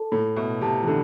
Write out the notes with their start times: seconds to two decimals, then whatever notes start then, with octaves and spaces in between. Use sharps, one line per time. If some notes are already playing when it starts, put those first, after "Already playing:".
Already playing: A4 A5
0.12 A2 A4
0.36 B2 E5
0.61 C3 A5
0.83 E3
0.87 D3 A4